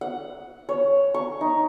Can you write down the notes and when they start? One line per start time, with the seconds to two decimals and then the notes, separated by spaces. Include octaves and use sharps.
0.01 F#5
0.69 C#5
1.14 C#6
1.41 D#4